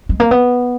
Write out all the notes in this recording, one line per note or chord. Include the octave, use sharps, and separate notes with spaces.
G#3
A#3
B3